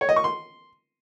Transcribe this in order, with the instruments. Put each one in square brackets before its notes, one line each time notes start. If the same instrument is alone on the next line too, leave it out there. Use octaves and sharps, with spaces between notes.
[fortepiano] C#5
D#5
C#6
C6